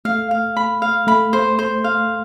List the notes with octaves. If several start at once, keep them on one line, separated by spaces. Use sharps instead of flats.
A3 F5
F5
B5
F5
A3 B5
C5
C5
F5